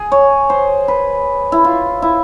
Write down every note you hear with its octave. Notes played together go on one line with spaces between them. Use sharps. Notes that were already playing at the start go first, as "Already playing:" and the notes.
Already playing: G#4
C#5
C5
B4
E4
F4
E4